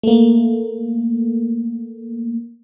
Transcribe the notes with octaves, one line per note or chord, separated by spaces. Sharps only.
A3 A#3